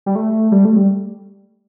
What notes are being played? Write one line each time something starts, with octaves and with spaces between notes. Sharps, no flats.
G3
A3
G3
A3
G3